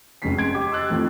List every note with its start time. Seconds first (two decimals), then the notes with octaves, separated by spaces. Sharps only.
0.22 F1 G#3 A3 C#4 B6 C7
0.38 C6 G#6 D7
0.54 G4 D#5 G5 C6 D6
0.72 E6 F#6 A6
0.90 F2 A2 D#3 F3